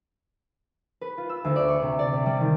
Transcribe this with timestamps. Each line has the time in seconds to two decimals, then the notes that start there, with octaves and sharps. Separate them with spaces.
1.01 B4
1.18 F4
1.29 E6
1.44 D2
1.56 D5
1.68 C#6
1.82 C3
1.99 D5
2.14 C3
2.26 G3
2.41 D#3